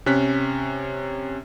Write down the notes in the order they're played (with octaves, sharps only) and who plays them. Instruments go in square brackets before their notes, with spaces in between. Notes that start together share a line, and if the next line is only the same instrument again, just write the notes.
[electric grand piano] C3 C#4 F#6 B6